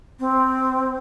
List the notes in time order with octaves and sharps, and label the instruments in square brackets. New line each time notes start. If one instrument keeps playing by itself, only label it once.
[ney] C4